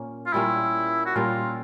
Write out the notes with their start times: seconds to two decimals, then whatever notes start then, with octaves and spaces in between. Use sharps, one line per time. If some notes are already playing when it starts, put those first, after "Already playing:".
Already playing: A#2 A#3 C#4
0.26 F4
0.33 A#2 G3 A#3 C#4 E4
1.06 F#4
1.15 A#2 G3 A#3 C#4 F4